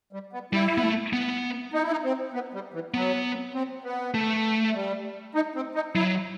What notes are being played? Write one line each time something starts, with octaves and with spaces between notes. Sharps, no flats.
G3
B3
G3 E4
B3
A3
B3
D#4
E4
D#4
C4
B3
G3
E3
F#3 B3
C4
B3
A3
A3
G3
D#4
C4
D#4
F#3 E4